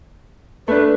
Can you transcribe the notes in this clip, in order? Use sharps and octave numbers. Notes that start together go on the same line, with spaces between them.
A3 D4 B4